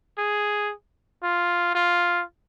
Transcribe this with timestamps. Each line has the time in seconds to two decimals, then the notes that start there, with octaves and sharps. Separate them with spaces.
0.18 G#4
1.23 F4
1.75 F4